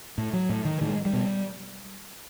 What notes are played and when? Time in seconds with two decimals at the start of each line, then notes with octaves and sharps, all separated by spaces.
0.18 A2
0.33 F#3
0.49 A2
0.65 D#3
0.81 A2 D#3
0.89 G#3
1.05 G3
1.13 B2